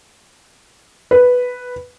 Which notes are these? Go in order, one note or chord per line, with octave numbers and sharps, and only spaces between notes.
B4